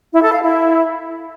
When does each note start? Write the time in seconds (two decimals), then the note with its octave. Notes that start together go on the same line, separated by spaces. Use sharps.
0.13 E4
0.23 A4
0.32 F5
0.42 E4